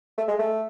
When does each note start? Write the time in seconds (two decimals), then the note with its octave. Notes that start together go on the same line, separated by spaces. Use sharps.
0.18 A3
0.28 G#3
0.39 A3